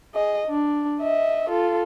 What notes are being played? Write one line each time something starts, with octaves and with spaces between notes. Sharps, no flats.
G#4 D#5
D4
D#5 E5
F4 A4